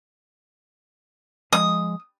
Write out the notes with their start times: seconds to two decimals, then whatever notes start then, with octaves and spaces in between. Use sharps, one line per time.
1.53 F3 G#3 D#5 D#6